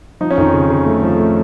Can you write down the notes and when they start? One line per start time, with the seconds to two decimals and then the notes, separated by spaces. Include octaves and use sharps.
0.21 F3 D#4
0.30 C#4
0.38 F2 D#3 D#4
0.54 C#3
0.70 C#3
0.86 A3
1.03 F3
1.18 A3